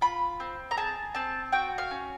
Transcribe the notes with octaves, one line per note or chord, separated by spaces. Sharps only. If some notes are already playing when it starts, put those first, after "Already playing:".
F4 B5
C4
A#5
G#4 A5
C4 A5
F#4 G5
F5
C#4